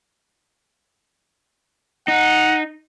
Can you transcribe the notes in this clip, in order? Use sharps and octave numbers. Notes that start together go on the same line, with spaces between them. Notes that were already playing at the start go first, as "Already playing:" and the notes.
D#4 F#5